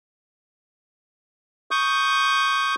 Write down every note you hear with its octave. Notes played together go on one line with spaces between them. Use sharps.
C#6 D#6 G6